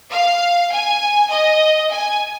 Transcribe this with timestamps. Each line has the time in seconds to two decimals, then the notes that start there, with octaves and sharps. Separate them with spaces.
0.12 F5
0.71 G#5
1.30 D#5
1.90 G#5